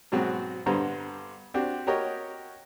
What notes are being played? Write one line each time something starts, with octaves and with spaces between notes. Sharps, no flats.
G#2 B2 F#3 C4 F#4
G2 D3 B3 C5 A#5
C4 D4 F#4 G4
F#4 G4 A#4 C#5 D#5